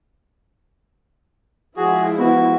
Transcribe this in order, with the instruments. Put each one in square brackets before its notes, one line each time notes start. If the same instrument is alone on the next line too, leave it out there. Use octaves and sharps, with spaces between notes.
[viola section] F3 G#3 E4 [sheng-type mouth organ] F#4 G#4
[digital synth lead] B3 [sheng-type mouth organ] F#4